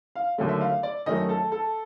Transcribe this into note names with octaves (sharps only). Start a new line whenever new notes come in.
F5
D#2 D3 F#3 A3
E5
F5
D5
F#2 D#3 F#3 A3 D#5
A4
A4